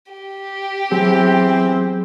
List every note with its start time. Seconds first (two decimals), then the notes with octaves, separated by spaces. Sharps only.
0.12 G4
0.92 E3 F#3 B3 C4 G#4